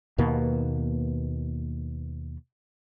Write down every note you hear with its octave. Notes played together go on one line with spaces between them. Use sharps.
D#2 B2 A#3 B3